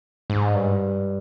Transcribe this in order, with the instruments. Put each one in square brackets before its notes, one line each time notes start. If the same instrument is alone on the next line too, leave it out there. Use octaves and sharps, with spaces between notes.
[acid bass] G#2
G2